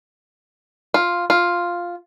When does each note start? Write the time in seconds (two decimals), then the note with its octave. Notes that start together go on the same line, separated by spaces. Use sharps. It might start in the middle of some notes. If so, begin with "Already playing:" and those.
0.94 F4
1.30 F4